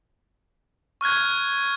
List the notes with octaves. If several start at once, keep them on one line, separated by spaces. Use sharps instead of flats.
C#6 F6 F#6 G#6